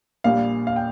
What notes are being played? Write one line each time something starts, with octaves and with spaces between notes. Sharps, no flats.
A#1 A#2 G3 A#3 F5
F5
G5